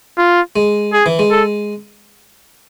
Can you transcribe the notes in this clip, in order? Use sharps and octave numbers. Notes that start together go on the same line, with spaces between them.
F4
G#3
G#4
E3
G#3
A4